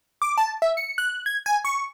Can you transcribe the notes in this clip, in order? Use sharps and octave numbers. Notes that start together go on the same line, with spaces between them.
D6
A5
E5
C#7
F#6
G#6
G#5
C#6